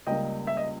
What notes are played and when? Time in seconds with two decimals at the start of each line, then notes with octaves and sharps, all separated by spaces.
0.07 C#2 C#3 G3 A#3 D#5 G5
0.47 E5
0.57 D#5